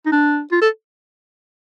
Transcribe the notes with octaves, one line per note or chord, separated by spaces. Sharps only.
D#4
D4
F4
A4